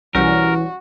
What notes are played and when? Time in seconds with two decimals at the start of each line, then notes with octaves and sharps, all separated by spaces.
0.15 B1 E3 G3 C#4 F#4 A#4